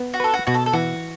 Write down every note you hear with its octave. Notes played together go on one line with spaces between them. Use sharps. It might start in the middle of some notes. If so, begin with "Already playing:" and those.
Already playing: B3
F#4
A4 B4
F#4
B2 F#4
A4
A4
E3 F#4